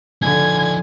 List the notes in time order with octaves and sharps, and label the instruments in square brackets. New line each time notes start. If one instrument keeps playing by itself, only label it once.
[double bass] D3 [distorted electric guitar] F3 D#4 [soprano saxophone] G#5 [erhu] G#6